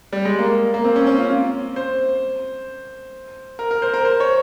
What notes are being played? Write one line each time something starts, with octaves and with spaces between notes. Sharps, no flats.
G3
G#3
A#3
A#3
C4
C#4
C#4
F4
C5
A#4
A#4
C5
A#4
C5
C#5